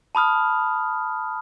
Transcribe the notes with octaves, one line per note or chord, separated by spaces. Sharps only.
A5 B5 D#6 F6